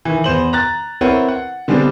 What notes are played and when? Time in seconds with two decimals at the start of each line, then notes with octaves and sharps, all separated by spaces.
0.05 D#3 E3
0.24 E2 B3 C5 F#7
0.53 A#5 F#6 A6
1.01 C4 E4 A#4 B4 C#5 F#5
1.28 F#5
1.68 D3 G3 G#3 B3 C4 D4